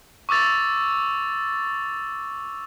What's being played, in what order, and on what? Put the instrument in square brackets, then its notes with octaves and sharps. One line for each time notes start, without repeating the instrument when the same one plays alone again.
[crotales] C#6 D6 E6 A6 F7